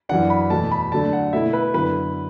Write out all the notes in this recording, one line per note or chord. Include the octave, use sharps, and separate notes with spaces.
F#2 E3 D4 F#5
B5
E2 B2 A3 A5
B5
D3 F#3 A3 D4 A5
F#5
B2 A3 E4 E5
B4
F#2 D3 B3 E4 B4